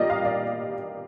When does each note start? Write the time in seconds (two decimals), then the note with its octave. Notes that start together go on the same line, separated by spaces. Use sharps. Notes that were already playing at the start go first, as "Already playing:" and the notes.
Already playing: A#2 G3 A#3 D#4 D5 D#5
0.10 F5
0.25 D5